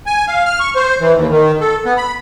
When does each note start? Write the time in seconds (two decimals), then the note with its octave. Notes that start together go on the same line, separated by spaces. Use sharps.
0.06 G#5
0.28 F5
0.46 F6
0.60 C#6
0.76 C5
1.01 E3
1.15 D#2
1.31 D#3
1.61 A4
1.85 B3
1.97 B5